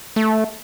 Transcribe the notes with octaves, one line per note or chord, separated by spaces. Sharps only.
A3